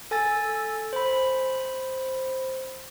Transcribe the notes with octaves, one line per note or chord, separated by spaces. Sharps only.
A4 G#5 E6 A6
C5 B5